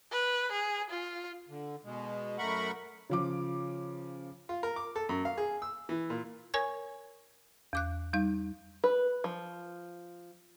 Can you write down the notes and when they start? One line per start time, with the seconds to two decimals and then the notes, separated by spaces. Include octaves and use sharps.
0.12 B4
0.52 G#4
0.91 F4
1.49 D3
1.84 B2 G#3
2.38 F#2 A3 A#4 F#5 B5 C#6
3.10 C#3 F3 D6
4.49 F4
4.63 A#4
4.76 D6
4.96 A4
5.09 F#2
5.25 F5
5.38 G#4
5.62 E6
5.89 E3
6.10 A#2
6.54 A#4 C#5 G#5 C#6 G#6
7.73 E2 D6 F#6
8.13 G3 D#4 F5
8.84 B4
9.24 F3